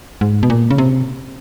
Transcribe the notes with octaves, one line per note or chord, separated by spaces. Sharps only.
G#2
B2
A#2
C#3
C3